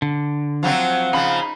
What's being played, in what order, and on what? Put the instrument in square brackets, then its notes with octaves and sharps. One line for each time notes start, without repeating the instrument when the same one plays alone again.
[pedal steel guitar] D3
[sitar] F3 F#3 C4 [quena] F#5
[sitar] C#3 F3 [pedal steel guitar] D#4 B5